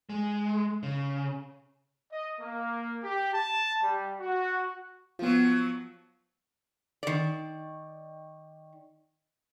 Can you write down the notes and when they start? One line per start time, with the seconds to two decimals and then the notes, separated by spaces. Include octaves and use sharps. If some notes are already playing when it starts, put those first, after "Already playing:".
0.09 G#3
0.83 C#3
2.12 D#5
2.41 A#3
3.04 G4
3.34 A5
3.82 G3
4.20 F#4
5.19 F3 F#3 B3 F4
7.03 D#3 D5